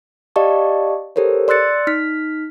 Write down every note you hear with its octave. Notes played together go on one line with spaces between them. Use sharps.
G4 D5 D#5 F5 A5 C#6
G4 A4 A#4 C5 C#5
D5 C6 E6 F#6 A6 C#7
D#4 F6 B6